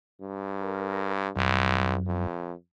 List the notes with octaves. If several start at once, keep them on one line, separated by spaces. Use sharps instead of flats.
G2
A#4
C2 F#2
F2